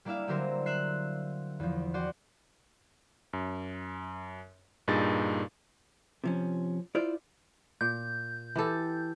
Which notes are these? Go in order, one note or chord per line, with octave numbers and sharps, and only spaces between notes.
G3 A#3 D4 E4 E5 F5
D3 F#3 C4 G4 A#4 C5
E5 C6 F#6 C7
E2 F3
F#4 D5 F#5 G5 C6
F#2
G2 A#2 D#4 G#4 A6
C3 F3 C#4
E4 F4 C5 D5
A#2 G6
E3 G4 A4